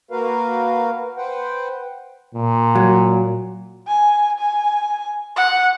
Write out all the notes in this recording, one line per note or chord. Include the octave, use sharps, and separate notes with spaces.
A#3 F#4 A#4 B4 F5
B4 C5 F#5 G5
A#2
F#3
G#5
G#5
F#5